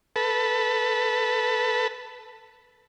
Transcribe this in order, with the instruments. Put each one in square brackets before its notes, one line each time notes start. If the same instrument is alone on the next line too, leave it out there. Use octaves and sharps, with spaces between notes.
[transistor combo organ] A4 B4